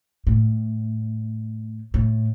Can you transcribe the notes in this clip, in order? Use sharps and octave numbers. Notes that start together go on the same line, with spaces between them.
A2
A2